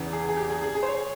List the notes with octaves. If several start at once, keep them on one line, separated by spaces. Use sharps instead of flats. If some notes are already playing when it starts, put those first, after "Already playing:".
Already playing: E2 C#3 E3
G#4
G#4
G4
G#4
G#4
G#4
C5
C#5